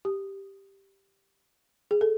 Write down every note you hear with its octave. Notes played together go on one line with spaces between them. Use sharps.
G4
G#4
A4